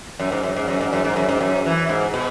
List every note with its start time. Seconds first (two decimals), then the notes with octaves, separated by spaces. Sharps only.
0.19 F#2
0.32 G#2
0.43 F#2
0.56 G#2
0.68 F#2
0.81 G#2
0.93 F#2
1.04 G#2
1.16 F#2
1.28 G#2
1.41 F#2
1.66 E3
1.89 G#2
2.14 B2